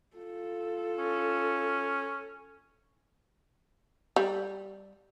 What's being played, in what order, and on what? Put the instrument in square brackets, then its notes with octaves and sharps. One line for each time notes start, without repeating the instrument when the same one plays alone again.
[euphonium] F4 [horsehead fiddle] A4
[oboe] C#4
[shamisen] G3